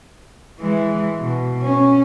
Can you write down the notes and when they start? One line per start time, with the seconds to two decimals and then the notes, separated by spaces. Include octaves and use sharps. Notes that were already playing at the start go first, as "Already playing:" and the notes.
0.60 E3 G#3
1.19 B2
1.62 C#4